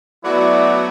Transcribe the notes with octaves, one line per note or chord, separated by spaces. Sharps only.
F#3 A3 B3 E4 F#4 D5